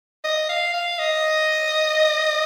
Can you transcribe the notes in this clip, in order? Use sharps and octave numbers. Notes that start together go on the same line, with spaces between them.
D#5
F5
F5
D#5